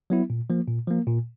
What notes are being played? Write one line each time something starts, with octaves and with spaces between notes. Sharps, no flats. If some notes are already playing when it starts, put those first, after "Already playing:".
F#3 B3 E4
A#2
F3 A#3
A#2
F3 A#3
A#2